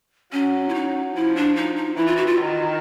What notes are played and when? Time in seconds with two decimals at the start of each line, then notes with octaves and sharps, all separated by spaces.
0.32 F#3 C#4
0.69 E4
0.74 D#4
1.15 F3 E4
1.36 D4
1.56 D#4
1.76 D#4
1.96 E3 E4
2.06 F4
2.16 F#4
2.27 F4
2.38 D#3